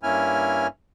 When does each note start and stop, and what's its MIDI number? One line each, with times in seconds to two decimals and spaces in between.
0.03 0.67 43
0.03 0.67 58
0.03 0.67 61
0.03 0.67 64
0.03 0.67 80
0.03 0.67 89